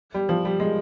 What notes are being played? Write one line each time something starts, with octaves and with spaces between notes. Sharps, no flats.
G3
F3
G3
G#3